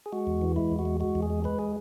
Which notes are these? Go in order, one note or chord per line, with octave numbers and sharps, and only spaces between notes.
G#4
G#3 F#4
E2
E3
G#3 E4
E2
F#4
G#3
G#3 F#4
E2
G#4
G#3
G#3 B4
G#4